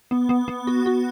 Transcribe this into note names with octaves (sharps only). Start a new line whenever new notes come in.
B3
B3
B3
F#4
F#4